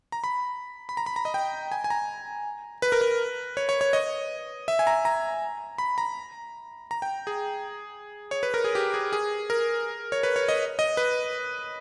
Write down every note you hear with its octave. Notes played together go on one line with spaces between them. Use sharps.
A#5
B5
B5
A#5
B5
A#5
D#5
G5
G#5
G#5
A#5
B4
A#4
B4
C#5
C#5
C#5
D#5
E5
G#5
A#5
A#5
B5
A#5
A#5
G5
G#4
C#5
B4
A#4
G#4
G4
G#4
G#4
A#4
C#5
B4
C#5
D#5
D#5
B4